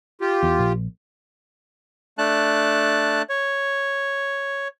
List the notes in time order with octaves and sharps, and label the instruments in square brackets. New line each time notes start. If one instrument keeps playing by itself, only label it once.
[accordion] F4 G4
[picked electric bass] E2
A#1
[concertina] A3 D4 A5 F#6
C#5